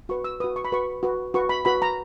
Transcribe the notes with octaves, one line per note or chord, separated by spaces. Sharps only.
F#4 B4 C#6
E6
F#4 B4 D#6
C#6
B5
F#4 B4 C#6
F#4 B4
F#4 B4 C#6
B5
F#4 B4 B5
A#5